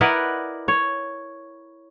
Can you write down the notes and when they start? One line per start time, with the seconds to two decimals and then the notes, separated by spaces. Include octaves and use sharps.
0.01 E4 A#4 B4 D5 D#5 F#5
0.68 C#5